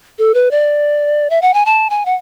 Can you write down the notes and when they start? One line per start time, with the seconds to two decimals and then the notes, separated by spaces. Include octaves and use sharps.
0.19 A4
0.34 B4
0.51 D5
1.30 E5
1.42 F#5
1.54 G#5
1.66 A5
1.90 G#5
2.05 F#5